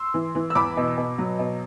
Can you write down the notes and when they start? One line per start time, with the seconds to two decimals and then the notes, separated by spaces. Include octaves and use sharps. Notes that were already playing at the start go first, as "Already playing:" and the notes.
Already playing: C6 E6
0.14 E3
0.35 E3
0.50 E6
0.55 E2 B5 D6
0.77 B2
0.97 B2
1.18 F#3
1.39 B2